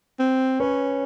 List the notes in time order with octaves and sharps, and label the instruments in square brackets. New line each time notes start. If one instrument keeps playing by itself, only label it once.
[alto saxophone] C4
[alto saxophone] C#4 [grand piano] B4 C#5